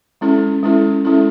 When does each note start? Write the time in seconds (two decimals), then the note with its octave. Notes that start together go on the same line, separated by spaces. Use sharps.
0.21 G#3 C#4 E4 A4
0.63 G#3 C#4 E4 A4
1.05 G#3 C#4 E4 A4